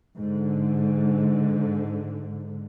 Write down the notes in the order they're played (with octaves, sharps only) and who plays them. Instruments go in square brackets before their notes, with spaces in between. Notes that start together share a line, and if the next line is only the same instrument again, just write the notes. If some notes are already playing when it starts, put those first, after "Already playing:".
[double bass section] G#2 D3